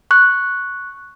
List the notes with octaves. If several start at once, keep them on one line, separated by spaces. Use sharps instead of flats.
C#6 F#6